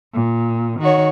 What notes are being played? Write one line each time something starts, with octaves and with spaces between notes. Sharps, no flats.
A#2
D#3 F#4 C#5